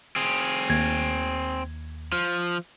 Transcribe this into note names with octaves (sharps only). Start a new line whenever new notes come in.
C4 G#4
D#2 G#6
F3